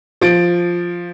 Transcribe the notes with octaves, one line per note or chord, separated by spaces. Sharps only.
F3 A6 D7